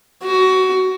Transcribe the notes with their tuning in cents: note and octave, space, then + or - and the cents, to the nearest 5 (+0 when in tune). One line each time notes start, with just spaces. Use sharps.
F#4 +20